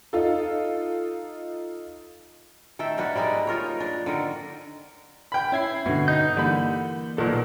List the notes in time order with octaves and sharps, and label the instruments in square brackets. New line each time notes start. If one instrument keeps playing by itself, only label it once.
[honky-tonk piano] D#4 F4 A4
[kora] D#3 A3 E5 G5
A#3 D4 F#4 B4
G3 G#3 D#4 D5
D#4 F4 A#4 C#5
D4
D3 D#3 A#4
[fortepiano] G5 B5
[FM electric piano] C#4 G#6 C7 [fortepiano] E4
[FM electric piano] G2 D3 [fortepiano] B2
[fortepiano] D#4 [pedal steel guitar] G6
[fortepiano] D3 B5 [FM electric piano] E3 G3 A#3
[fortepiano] B1 A#2 [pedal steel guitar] A4 A#4